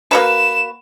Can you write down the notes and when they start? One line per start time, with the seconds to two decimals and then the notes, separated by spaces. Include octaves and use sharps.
0.11 A#3 F#4 B4 E7